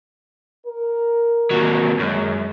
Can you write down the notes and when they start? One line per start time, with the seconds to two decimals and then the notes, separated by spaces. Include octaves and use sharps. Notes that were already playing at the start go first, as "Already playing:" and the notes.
0.66 A#4
1.50 D#2 F#3
1.99 F#2 G#3